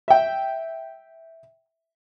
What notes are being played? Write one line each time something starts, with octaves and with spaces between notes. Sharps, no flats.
E5 G5